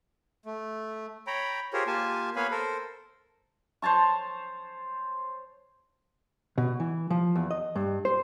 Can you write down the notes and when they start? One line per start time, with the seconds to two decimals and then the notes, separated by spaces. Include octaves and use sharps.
0.45 A3
1.27 C#5 G5 A#5 B5
1.73 F4 G4 G#4 A#4 C5 C#5
1.87 A#3 F4 G4 G#5 A5
2.36 A#3 B3 C#5 F5 G#5 B5
2.51 A4 A#4 C5
3.82 C5 C#5 A5 C#6
6.58 B2
6.80 E3
7.10 F3
7.36 E2
7.51 D#5
7.76 G2
8.05 C5